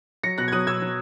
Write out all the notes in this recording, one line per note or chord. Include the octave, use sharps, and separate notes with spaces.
F#3 A#6 C#7
B2 F#6 A#6
G#6
F#3 D#6 F#6
B2 E6 G#6
F#3